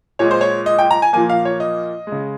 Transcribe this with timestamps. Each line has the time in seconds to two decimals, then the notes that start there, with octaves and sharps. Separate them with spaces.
0.19 A#2 G#3 C#5
0.31 C5
0.41 C#5
0.66 D#5
0.79 G5
0.91 A#5
1.02 G#5
1.13 A#2 F3 A#3 G#5
1.29 F5
1.45 C#5
1.60 D#5
2.07 G#3
2.12 C#3